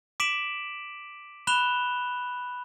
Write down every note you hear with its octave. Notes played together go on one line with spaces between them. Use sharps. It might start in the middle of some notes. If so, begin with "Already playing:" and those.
D6 B6 D7 E7 F#7
B5 F#6 E7 F7 G7